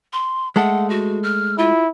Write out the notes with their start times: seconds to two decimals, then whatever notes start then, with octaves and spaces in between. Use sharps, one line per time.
0.13 C6
0.56 G#3 A3 A4 F#5
0.90 F#4
1.23 F6
1.58 E4 F4